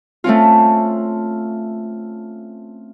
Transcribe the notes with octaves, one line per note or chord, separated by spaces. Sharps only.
A3 C4 C#4 F4